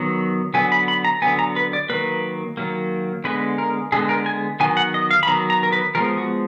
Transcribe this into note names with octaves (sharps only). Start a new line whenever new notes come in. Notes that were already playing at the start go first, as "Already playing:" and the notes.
Already playing: D#3 F#3 B3
D3 F#3 B3 G#5
B5
B5
A#5
D3 F#3 B3 G#5
A#5
B4
D5
D#3 F#3 A#3 B4
D#3 F#3 A#3
D3 G#3 B3 B4
A#4
D3 G#3 B3 G#4
A#4
G#5
D#3 F#3 B3 G#5
F#5
D#5
F5
B5
D#3 F#3 B3 A#5
A#5
A#4
B4
F3 G#3 B3 A#4
F#4